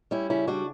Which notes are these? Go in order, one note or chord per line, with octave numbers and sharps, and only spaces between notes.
G3 C#4 E4
C#3 C#4 E4
G3 D4 F#4